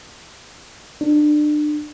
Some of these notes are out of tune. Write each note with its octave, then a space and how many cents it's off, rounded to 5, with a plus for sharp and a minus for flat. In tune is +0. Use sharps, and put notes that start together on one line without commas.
D4 +30